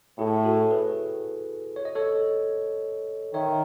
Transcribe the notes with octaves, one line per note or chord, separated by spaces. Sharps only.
A2 E4 G#4
F#4 A4
G#4 B4
C#5
D#5
A4 C#5
D#3 C#5 E5